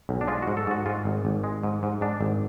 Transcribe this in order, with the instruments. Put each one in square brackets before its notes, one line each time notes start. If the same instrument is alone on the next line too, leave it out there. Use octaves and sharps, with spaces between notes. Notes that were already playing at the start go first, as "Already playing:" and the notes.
[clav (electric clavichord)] B1
D4
G#3 F4
F#4
G#2
A4
G#2 F#4
G#2 F4
G#1
G#1
G#3
G#2
G#2
G#2 D4
G#1